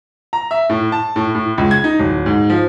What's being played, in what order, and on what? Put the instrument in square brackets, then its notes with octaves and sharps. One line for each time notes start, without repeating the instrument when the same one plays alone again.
[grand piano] A#5
E5
A2
A5
A2
A2
C#2
G#6
D#4
D1
G#2
F3